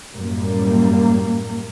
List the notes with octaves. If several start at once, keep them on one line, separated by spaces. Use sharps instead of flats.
F#2 A2 G3 A#3